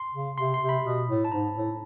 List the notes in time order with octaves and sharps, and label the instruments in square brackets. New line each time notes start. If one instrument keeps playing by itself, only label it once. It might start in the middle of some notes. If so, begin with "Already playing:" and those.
Already playing: [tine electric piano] C6
[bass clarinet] C#3
[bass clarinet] C3 [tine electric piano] C6
[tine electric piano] C6
[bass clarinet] C3
[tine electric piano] B5
[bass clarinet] B2
A2
[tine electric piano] A5
[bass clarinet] G#2 [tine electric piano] A#5
[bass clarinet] A2